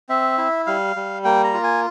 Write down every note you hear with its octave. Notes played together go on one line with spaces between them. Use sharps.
C4 E5
E4
G3 F5
G3
A#3 G5
A#5
F4
G#5